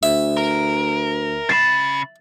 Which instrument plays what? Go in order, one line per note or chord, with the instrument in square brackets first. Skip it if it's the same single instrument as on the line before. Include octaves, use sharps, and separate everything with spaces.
[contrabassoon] D2 [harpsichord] E5
[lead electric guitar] A#4
[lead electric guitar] C#3 B5 [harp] A6 C7 E7